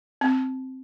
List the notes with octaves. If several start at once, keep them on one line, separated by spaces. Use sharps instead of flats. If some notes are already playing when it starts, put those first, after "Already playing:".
C4